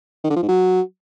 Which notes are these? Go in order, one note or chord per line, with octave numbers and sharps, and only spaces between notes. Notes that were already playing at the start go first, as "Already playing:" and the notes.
D#3
D3
F3
G#2
F#3